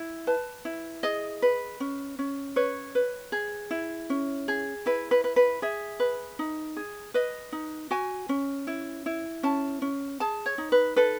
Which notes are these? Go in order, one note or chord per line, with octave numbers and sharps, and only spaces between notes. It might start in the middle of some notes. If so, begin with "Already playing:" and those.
Already playing: E4
B4 A5
E4
G#4 D#5
B4
C#4
C#4
B4 C#5
B4
G#4
E4
C#4
G#4
E4 B4
B4
B4
B4
G#4 E5
B4
D#4
G#4
B4 D#5
D#4
F#4 G#5
C#4
E4
E4
C#4 A5
C#4
G#4 A5
C#5
D#4
B4
A4 B4